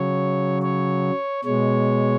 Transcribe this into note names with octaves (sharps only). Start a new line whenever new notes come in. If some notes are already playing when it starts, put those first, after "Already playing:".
Already playing: C#3 F#3 C#5
C#5
B2 G#3 C#5